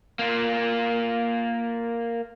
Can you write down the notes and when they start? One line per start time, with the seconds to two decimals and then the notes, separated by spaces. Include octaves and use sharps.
0.19 A#3 F4